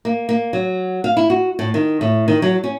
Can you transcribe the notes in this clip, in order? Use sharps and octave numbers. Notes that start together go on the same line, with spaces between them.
A#3
A#3
F#3
F5
E4
F#4
A2
D#3
A2
D#3
F#3
C#4